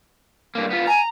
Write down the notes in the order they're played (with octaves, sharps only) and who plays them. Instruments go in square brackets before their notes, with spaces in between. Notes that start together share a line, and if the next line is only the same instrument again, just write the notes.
[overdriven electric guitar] G2 A#3
B3 F4
[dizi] G#5 [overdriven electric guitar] A#5